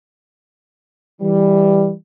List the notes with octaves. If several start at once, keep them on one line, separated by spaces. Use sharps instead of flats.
E3 G3